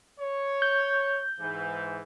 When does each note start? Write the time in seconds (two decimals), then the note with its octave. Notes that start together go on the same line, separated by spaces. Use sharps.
0.20 C#5
0.62 G6
1.39 G#2 E3